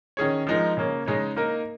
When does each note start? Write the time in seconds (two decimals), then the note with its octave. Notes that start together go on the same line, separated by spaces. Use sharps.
0.17 D#3 C#4 G#4 C#5
0.47 F3 G#3 D#4 A#4
0.77 C#3 A#3 C#4
1.06 C#3 G#3 D#4 C#5
1.36 A#3 D#4 A#4